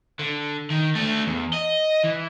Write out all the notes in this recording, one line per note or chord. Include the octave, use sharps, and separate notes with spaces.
D3
D#3
A3 D4
E2
D#5
E3